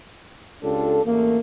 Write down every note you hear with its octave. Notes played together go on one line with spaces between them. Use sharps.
C#2 D4 F4 G4 A4
A1 E2 A3 A#3